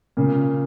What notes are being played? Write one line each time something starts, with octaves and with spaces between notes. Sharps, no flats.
A#2 C#3